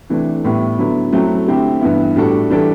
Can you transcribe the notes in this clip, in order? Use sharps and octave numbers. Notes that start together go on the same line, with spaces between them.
C3 E3 A3 D4
A2 G3 B3 E4
D3 F#3 B3 E4
F#2 F#3 A3 C4 E4
D3 A3 C4 E4 G4
G2 E3 B3 E4
A2 G3 D4 F#4 A4
E3 G3 D4 A4